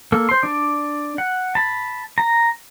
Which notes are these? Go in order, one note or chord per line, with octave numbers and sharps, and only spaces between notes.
A#3 A4
C5 C6
D4 D5
F#5
A5 B5
A#5